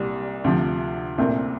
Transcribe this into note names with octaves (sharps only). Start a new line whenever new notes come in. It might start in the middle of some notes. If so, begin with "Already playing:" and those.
Already playing: C2 A#2 G3
D2 C3 F3
C2 A#2 A3 C4